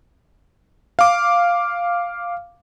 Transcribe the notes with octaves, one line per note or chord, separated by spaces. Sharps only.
F5 D6